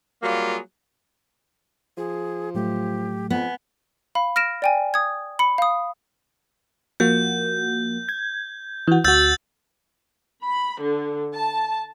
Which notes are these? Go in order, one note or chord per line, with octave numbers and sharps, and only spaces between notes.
F#3 G3 A#3 F4 G#4
F3 G#4
A2 F#3 A3 G4
F2 B3 G#5
F5 B5
F6 A#6 D7 E7
D5 G5 G#5
D#6 G#6
B5 C#7
F5 D#6
F3 A#3 F#4 G6
G#6
E3 F#4
D2 F#4 E6 G6 A6
B5
D3
A5